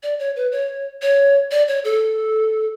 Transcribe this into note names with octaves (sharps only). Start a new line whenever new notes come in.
D5
C#5
B4
C#5
C#5
D5
C#5
A4